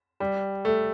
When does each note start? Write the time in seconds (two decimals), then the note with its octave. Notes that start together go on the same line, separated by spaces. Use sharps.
0.20 G3
0.65 A3